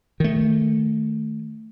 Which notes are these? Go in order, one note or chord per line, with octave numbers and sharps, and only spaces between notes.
D#3 A3